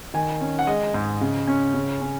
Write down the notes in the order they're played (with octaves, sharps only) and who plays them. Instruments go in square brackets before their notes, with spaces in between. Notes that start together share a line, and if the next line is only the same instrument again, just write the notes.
[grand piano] D#3 G#5
C#4
F#5
G#3 D#5
G#2
C#3
C#4
C#3
C#4